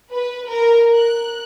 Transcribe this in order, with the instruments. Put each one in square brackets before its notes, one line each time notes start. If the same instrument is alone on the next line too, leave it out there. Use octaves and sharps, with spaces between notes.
[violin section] B4
A#4
F#6